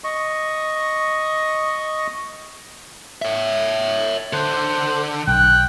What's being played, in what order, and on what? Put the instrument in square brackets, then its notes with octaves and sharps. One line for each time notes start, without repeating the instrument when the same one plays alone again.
[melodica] D#5 C#6
[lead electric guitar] C#5 E5
[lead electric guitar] D3 [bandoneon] C5
[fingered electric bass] B1 [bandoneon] G5 [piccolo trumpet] F#6